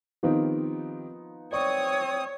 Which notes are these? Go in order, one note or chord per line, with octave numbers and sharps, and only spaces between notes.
D#3 F3 B3 C4 D#4 G4
C4 C#5 D5 C#6 D#6